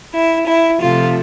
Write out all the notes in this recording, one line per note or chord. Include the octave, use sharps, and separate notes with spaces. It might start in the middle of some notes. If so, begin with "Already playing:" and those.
E4
E4
C3 F3 A3 F4